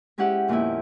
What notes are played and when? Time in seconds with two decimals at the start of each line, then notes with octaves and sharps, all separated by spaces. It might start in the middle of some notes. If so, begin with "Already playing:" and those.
0.18 G#3 C#4 E4 G4 F#5
0.48 F2 A#2 D#3 B3 E4